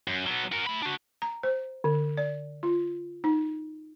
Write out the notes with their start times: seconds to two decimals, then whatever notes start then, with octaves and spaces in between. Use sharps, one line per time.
0.08 F#2
0.27 F#3 B3
0.52 F#4 A#4
0.67 A3 B5
0.82 D4 F#4
1.22 A#5
1.43 C5
1.84 D3
2.17 D5
2.63 F4
3.24 D#4